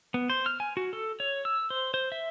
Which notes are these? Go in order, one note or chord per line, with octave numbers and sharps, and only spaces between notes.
B3
C5
F6
G#5
F#4
A4
C#5
E6
C5
C5
E5